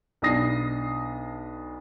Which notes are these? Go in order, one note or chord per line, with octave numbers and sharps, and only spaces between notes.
B1 D4 E4 D#6 A#6 C7